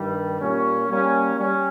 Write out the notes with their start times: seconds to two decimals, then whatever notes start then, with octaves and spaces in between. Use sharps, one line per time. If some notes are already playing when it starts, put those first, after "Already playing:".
Already playing: G2 D#3 G3
0.40 A#2 G3 C#4
0.89 G3 A#3 C#4
1.36 G3 C#4